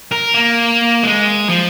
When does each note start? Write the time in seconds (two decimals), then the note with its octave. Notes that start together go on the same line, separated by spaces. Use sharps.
0.11 A#4
0.34 A#3
1.03 G#3
1.49 F3